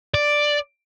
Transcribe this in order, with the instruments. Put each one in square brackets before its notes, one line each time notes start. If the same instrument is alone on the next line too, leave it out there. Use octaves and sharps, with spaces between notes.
[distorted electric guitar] D5